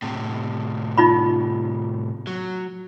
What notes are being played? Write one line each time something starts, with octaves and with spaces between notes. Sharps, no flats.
A2 C3
D#4 F4 B5
F#3